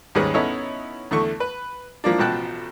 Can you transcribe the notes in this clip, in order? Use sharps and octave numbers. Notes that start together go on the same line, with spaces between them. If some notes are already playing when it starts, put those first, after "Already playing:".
D#2 G#2 G3 C#4 G#4 B4
B3 C#4 D#4 E4 A4 C#5
E2 D3 A3 C#6
B4
E3 F3 A#3 D4
A1 B2 F3 G5 A5 F#6